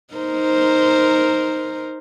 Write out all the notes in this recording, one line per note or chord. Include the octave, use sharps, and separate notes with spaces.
D#4 A#4 C5